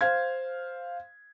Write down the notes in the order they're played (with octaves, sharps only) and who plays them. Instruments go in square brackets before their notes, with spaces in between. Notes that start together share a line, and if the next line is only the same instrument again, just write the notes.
[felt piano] C5 F5 G#6